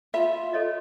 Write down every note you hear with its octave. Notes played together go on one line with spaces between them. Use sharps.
F4 E5 F5 B5
A4 C#5 D#5